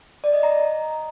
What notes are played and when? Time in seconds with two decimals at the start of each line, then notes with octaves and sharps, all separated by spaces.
0.24 D5
0.33 D#5
0.43 A#5